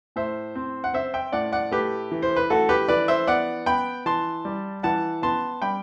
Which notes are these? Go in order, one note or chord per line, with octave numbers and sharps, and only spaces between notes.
A2 C5 E5
C4
F#5
C4 C5 E5
E5 G5
A2 D5 F#5
D5 F#5
A3 G4 B4
E3
C5
B4
A3 F#4 A4
G4 B4
E3 B4 D5
C5 E5
B3 D5 F#5
B3 G5 B5
E3 A5 C6
G3
E3 F#5 A5
B3 A5 C6
G3 G5 B5